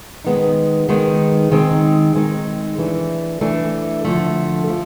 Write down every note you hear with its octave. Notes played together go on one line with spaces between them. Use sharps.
D#3 G#3 B3 D#4
D#3 G#3 B3 D#4
D#3 G#3 C4 D#4
D#3 G#3 C4 D#4
E3 A3 D4
E3 A3 D4
D3 F3 A3
F3 A3